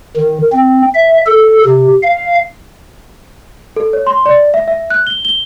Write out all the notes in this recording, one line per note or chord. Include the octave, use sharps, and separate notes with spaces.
D#3
C4
E5
A4
C3
F5
A4
C#5
C6
D5
E5
E5
F#6
G7
G7